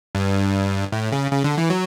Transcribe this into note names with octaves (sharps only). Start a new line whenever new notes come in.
G2
A2
C#3
C#3
D3
E3
F#3